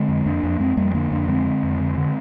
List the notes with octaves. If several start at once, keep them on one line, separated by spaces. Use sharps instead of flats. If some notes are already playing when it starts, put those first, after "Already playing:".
Already playing: D3 G#3 C4
F2
F2 A#3 D4
F2
F2 G#3 C4
F2 G3 A#3
D3 A#3 D4
F2 A#3 D4
D3 G#3 C4
D3
F2
D3
D3